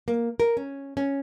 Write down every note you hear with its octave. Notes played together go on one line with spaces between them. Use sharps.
A#3
A#4
C#4
C#4